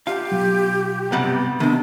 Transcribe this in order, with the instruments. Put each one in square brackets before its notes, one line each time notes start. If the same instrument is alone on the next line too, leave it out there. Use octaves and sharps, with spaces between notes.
[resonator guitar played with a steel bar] F4 [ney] G4 [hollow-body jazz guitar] F5 [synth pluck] F#5
[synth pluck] B2 F#3
[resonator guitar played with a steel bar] G2 C3 G3 [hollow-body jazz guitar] B3 F#5
[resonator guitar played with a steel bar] C3 G#3 [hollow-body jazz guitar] D#3 B3 [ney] D4